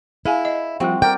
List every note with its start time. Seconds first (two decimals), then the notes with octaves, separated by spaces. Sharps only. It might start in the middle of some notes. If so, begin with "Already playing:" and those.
0.25 E4 G#4 F5 G#5
0.45 D#5
0.80 F3 G3 C4 F#4 G4
1.02 A#4 D5 G5